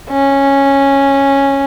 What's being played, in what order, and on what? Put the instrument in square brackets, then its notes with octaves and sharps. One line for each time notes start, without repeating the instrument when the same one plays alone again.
[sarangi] C#4